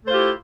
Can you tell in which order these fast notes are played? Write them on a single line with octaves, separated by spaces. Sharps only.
A3 C5 F4 G4 E4